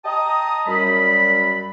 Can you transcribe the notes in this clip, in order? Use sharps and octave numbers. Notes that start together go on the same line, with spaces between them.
D#5 G5 A5 A#5 D#6
F#2 G3 B5